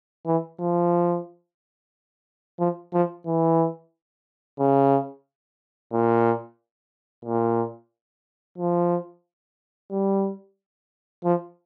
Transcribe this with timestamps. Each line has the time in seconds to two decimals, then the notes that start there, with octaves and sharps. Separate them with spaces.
0.26 E3
0.60 F3
2.59 F3
2.93 F3
3.26 E3
4.59 C#3
5.93 A#2
7.25 A#2
8.58 F3
9.91 G3
11.24 F3